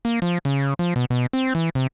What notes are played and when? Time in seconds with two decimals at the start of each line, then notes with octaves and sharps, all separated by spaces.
0.05 A#3
0.22 F3
0.45 C#3
0.79 F3
0.96 B2
1.10 B2
1.33 C4
1.55 E3
1.75 C3